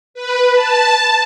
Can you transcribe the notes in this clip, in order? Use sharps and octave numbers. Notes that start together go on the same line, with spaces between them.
B4
A5